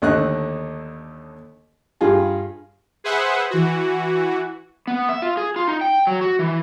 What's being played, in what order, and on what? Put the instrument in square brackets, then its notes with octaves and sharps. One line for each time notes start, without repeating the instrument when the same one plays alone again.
[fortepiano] D#2 D3 A3 D#5 F#6
G2 F4 G#4
[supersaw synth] G#4 B4 C5 E5 F#5
E3 F#4
[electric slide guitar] B3
E5
F4
G#4
F4
D#4
G5
F#3
F#4
E3